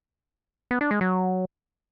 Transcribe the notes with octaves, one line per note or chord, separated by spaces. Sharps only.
B3
D4
G#3
F#3